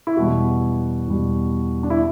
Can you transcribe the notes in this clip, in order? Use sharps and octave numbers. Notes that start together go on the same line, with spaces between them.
E4
E2 B2 G3 F#4
E2 B2 G3
D4
E4